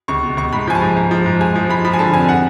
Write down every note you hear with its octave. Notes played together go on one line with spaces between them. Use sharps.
C#2 C#6
B2
C#2 C#6
G#2 B5
F3 G#5
A5
G#2
G#2
F3
G#2
G#2 G#5
F3
G#2 B5
F3 B5
G#5
D3 A5
F2 G#5
F#5